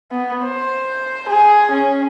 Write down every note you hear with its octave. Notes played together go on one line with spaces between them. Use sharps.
B3
C5
G#4
C#4